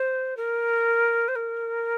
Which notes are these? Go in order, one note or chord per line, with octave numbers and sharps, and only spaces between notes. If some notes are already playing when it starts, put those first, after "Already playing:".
Already playing: C5
A#4
C5
A#4